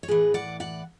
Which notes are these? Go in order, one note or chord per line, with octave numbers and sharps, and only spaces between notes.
C#5
A2 E3 G#4 B4
D5 F#5
D5 F#5